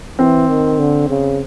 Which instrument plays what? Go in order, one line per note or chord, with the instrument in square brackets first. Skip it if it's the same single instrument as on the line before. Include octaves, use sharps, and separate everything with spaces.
[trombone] E3 [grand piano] C4
[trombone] D#3
D3
C#3